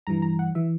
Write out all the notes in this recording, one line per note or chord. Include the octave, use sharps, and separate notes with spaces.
G2 E3 A#5
A#5
F#5
E3 E5